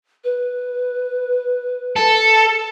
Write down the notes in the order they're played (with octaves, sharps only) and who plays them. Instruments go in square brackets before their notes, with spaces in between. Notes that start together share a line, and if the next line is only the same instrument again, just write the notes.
[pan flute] B4
[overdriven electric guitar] A4